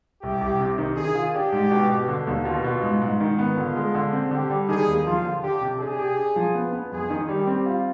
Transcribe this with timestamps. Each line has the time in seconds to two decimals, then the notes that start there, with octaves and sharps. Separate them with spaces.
0.22 C2 G4
0.41 C2
0.59 C3
0.78 D#3
0.97 D#3 G#4
1.15 F4
1.34 D4 G4
1.52 G#2
1.71 B2
1.89 B2
2.08 D3
2.27 D#2
2.45 B2 F4
2.64 B2
2.82 G#2
3.02 G#2
3.20 D#3
3.39 B3
3.57 D3 F4
3.76 G#3
3.95 D3
4.13 C4
4.31 D3 G4
4.50 G3
4.69 D#3 G#4
4.87 D#2
5.06 F3 F4
5.25 D3
5.43 D4 G4
5.61 C3
5.80 D4 G#4
5.99 G4
6.17 D4
6.36 F3
6.55 B3
6.73 B3
6.92 F2 G#4
7.10 D#3
7.29 G3 G4
7.47 C4
7.66 F4